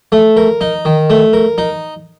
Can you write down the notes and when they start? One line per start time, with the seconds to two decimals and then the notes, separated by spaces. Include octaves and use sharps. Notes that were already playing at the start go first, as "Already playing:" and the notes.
0.12 A3
0.37 A#4
0.61 D#4
0.85 D#3
1.10 A3
1.33 A#4
1.58 D#4